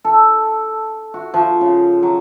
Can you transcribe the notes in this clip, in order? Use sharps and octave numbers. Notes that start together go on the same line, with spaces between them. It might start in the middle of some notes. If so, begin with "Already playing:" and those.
A4
F#4
F3
C#3
F#3